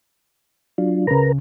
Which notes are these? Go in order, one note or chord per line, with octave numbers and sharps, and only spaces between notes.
F#3 D4 F4
C#2 C#3 A#4 B4 A#5